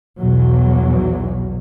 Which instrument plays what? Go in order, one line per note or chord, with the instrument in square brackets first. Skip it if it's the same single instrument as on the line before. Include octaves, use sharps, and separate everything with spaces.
[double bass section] B1 E2 B2 F#3